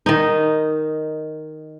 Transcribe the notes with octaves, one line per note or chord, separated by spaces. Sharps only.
D#3 D#4